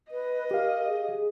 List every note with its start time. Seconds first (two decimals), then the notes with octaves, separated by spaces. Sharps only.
0.11 B4 D#5
0.51 G4 A#4 F5
0.87 G#4